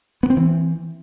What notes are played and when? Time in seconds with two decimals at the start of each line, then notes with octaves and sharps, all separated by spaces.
0.23 B3
0.30 C4
0.37 E3